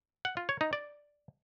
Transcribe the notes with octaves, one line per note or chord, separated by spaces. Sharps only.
F#5
F4
C#5
D#4
D5